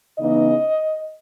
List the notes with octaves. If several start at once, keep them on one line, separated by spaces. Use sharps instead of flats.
C#3 E3 B3 D#4 D#5